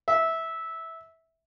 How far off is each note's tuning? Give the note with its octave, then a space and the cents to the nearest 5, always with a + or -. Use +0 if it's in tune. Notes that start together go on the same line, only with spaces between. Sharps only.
E5 -15